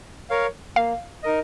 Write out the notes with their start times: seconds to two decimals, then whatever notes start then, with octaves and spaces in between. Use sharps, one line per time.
0.30 A#4 C#5 F5
0.76 A#3 F5
1.23 D#4 A#4 D#5